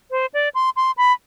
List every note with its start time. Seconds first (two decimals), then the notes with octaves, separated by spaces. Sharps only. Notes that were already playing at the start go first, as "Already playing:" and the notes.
0.11 C5
0.34 D5
0.55 C6
0.76 C6
0.97 B5